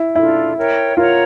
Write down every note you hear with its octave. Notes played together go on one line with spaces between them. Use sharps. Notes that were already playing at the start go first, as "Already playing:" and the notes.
Already playing: E4
D4 E4 F4 A4
A#4 C#5 E5 G5
F4 A#4 C#5 F#5 A#5